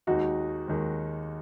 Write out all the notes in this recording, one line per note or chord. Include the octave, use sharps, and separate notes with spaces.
D#2 D#3 G#3 D#4 F#4
D#2 D#3 G#3